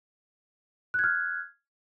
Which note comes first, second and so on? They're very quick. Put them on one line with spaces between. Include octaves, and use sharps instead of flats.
F#6 G#6 F6